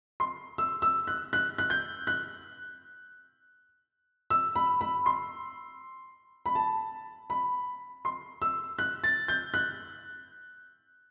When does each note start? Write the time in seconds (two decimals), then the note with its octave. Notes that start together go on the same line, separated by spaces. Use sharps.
0.20 C6
0.58 E6
0.82 E6
1.07 F#6
1.33 F#6
1.58 F#6
1.70 G6
2.07 F#6
4.30 E6
4.56 B5
4.81 B5
5.06 C6
6.46 B5
6.55 A5
7.30 B5
8.05 C6
8.42 E6
8.79 F#6
9.04 A6
9.28 G6
9.54 F#6